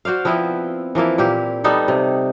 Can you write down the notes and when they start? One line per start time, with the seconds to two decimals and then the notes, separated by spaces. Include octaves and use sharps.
0.05 F#4 C5 D5 F5
0.25 F3 B3 C4 E4
0.95 E3 F3 A#3 E4
1.18 A#2 A#3 G4
1.64 G3 B3 D#4 A4
1.88 C3